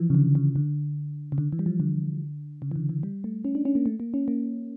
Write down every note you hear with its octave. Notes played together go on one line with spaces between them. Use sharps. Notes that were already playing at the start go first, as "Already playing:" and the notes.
Already playing: E3 F3
C#3
D3
C#3
D3
C#3
D3
E3
G3
F3
D3
C#3
E3
D3
E3
G3
A3
C#4
D4
C#4
A#3
A3
A#3
C#4
A#3